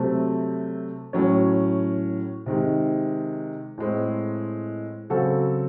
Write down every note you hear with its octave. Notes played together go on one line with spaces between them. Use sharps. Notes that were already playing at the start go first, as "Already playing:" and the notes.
Already playing: C3 F#3 A3 C4
A2 F#3 C#4
C3 D#3 G#3
A2 G#3 C4
C#3 F#3 C4 F#4 A4